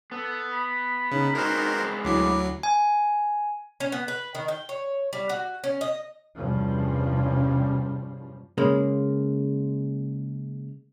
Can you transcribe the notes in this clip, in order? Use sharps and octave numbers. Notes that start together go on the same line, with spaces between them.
B3 A4
B5
C#3 D#4
G#3 B3 C4 F#4 A#4 C5
D2 F#3 E4 D6 C7
G#5
C#4
B3
B4
D#3
G5
C#5
G3
F#4
C#4
D#5
E2 G2 C3 F3 G3 C#4
C#3 G#3 A#3